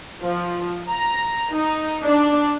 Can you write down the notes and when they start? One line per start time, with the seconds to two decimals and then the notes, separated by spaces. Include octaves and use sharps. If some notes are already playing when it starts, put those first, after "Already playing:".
0.22 F3
0.89 A#5
1.55 D#4
2.04 D4